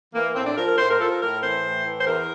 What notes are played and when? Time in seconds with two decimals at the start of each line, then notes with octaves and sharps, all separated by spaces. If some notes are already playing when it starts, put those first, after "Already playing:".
0.14 E3 A#3
0.35 A2 C4
0.46 D4
0.57 F3 A#4
0.67 A#4
0.78 A2 C5
0.89 A#4
0.99 F3 A4
1.11 A#4
1.21 A2 A#4
1.42 E3 C5
1.64 A2
1.86 E3
2.01 C5
2.07 E2 A#4